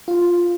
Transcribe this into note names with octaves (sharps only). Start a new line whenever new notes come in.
F4